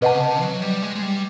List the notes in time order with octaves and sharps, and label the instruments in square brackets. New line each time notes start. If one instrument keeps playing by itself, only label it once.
[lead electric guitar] C3 [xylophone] B4 D#5 F#5 A5
[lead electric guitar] C#3
C3
F#3
G3
G#3
G#3
G3